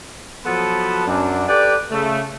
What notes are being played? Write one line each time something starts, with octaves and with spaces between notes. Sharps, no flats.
F3 F#3 B3 A4 B4 C5
F#2 D4
G4 A4 B4 D5
C#3 A3